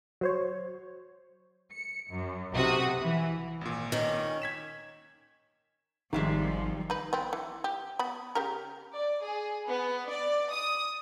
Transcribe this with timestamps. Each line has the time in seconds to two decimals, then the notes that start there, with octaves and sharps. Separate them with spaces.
0.21 F#3 C5 C#5
1.71 C#7
2.10 F#2
2.52 B1 C3 F#4 D#6
3.01 E3
3.61 G#1 A#2
3.92 D#3 C#4
4.42 G#6 B6 E7
6.13 G#1 G#2 C3 D#3 F3 G3 G#3
6.90 D#4 B4
7.13 B3 C4
7.33 E3
7.64 G4
7.99 B3 B5
8.35 C#3 G4 A#4
8.95 D5
9.25 G#4
9.67 B3
10.10 D5
10.53 D#6